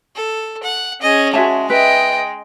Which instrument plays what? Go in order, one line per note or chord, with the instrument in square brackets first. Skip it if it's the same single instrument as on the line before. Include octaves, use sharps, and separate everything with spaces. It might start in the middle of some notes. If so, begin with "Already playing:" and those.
[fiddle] A4
F#5
[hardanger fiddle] C#4 G#4 [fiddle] D#5
[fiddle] G#3 [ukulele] F#4 E5 A5
[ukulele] B4 E5 [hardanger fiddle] D#5 G5